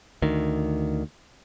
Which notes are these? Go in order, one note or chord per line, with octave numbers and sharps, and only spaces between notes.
D2 D#3